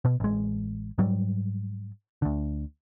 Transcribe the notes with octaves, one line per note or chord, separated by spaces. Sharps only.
B2
A1 G#3
G#2 F#3 G3
D2 D3